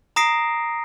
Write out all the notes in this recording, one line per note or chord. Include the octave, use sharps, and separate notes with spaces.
A#5 D#6 A#6 C7 D7